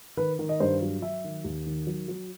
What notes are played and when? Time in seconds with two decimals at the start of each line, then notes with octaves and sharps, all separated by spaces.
0.17 D#3 B4
0.39 D#3
0.49 D#5
0.60 G2 C5
0.81 F#3
1.02 F#3 E5
1.24 D#3
1.44 D#2
1.67 D#3
1.87 F#3
2.08 F#3